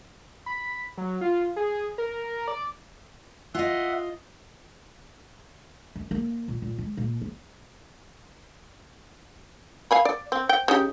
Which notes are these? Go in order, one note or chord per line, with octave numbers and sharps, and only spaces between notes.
B5
F#3
F4
G#4
A#4
D5
F4 D#5 E5 F#5
F#2
A#3
A#2
A#2
G#3
A#2
B3
F5 G#5 B5
D5
C4
G5
C#3 D#4 G4